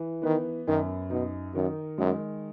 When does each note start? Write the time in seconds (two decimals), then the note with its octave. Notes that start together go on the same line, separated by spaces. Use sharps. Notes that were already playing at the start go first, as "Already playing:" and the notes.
Already playing: E3
0.23 D#3 B3
0.67 F#2 D#3
1.10 B2 D#4
1.54 F#2 D#3
1.98 F#2 G#3